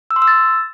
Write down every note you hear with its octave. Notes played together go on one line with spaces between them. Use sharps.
E6
C6
E6
A6